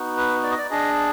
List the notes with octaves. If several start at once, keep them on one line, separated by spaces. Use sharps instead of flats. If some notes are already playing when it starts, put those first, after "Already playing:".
Already playing: B3 D#4 F#4
B4
D5
D#5
D5
D4 G#4 D#5